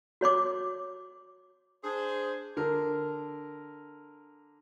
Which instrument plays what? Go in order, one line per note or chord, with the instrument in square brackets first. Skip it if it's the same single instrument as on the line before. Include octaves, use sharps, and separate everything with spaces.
[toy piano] F#4 C#5 C6 D6
[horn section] D4 G#4 C5
[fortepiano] D3 A#4